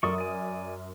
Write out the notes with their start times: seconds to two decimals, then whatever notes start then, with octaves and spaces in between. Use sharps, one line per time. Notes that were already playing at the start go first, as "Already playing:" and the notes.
0.03 F#2 A4 A#4 D5 C#6 D#6
0.18 D5 G#5